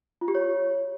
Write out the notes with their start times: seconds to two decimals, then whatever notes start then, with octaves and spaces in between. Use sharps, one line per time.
0.21 F4
0.28 G4
0.35 C#5